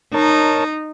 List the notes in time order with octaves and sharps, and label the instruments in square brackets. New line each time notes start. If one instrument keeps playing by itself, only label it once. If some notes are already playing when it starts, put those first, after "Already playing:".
[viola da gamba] D#4 [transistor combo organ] A#4 C#5 A5